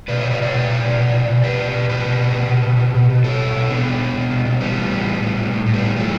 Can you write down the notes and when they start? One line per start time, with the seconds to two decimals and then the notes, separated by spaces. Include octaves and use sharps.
0.08 B2 B4 D5
0.20 B2 C#5 E5
0.31 B4 D5
0.38 B2 C#5 E5
0.53 B2 B4 D5
0.68 B2
0.83 B2
0.98 B2
1.14 B2
1.28 B2
1.44 B2 G4 B4
1.59 B2
1.74 B2
1.89 B2 G4 B4
2.04 B2
2.19 B2
2.34 B2
2.49 B2
2.64 B2
2.79 B2
2.94 B2
3.10 B2
3.24 B2 A4 C#5
3.40 B2
3.55 B2
3.70 B2 B3 D4
3.85 B2
4.00 B2
4.15 B2
4.30 B2
4.45 B2
4.60 E3 G3 B3
4.76 A2
4.91 E3
5.05 A2
5.20 A2
5.36 A2
5.51 A2
5.66 A2
5.74 G3 B3
5.81 A2
5.96 E3 F#3 A3